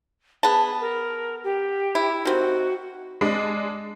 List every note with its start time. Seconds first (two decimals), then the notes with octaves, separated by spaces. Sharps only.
0.43 B3 G#4 A5
0.80 A#4
1.44 G4
1.95 E4
2.25 D#3 C4 F#4
3.21 G#3 D4